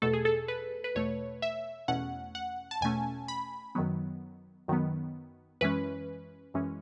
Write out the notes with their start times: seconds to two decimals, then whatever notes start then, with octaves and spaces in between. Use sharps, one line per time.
0.02 E2 B2 A3 A4
0.13 G#4
0.25 A4
0.48 B4
0.84 B4
0.95 E2 B2 A3 C#5
1.42 E5
1.88 E2 B2 A3 C#4 F#5
2.35 F#5
2.71 A5
2.81 E2 B2 A3 C#4 G#5
3.28 B5
3.75 F#2 D#3 F#3 B3
4.68 F#2 D#3 F#3 B3
5.61 F#2 E3 G#3 C#4 B4
6.54 F#2 E3 G#3 C#4